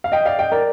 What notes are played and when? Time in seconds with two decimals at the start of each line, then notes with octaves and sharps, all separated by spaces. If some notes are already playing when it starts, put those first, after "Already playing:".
0.04 F5
0.12 D#5 G5
0.25 D5 F5
0.39 D#5 G5
0.52 A#4 D5